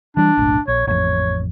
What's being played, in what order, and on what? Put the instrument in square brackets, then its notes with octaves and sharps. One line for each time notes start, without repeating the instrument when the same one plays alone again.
[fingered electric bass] E3 G3 [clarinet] D4
[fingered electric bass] F#1 B1 A2
[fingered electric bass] A#1 [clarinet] C#5
[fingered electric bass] A1 F2 [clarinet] C#5